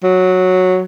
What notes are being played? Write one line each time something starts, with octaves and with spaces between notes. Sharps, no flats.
F#3